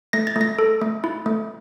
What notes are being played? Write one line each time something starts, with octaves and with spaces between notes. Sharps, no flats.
A3 A#6
A6
A3
A#6
A4
A3
E4
A3